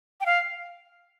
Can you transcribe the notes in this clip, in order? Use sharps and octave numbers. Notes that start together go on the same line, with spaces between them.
G5
F5